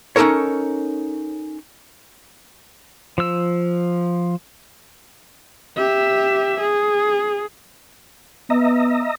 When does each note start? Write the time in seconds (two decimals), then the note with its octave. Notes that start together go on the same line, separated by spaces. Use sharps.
0.16 C#4 D#4 F4 A4 A#4 C#5
3.18 F3 E6
5.78 G4 E5
6.59 G#4
8.50 B3 D#5 E5 A#5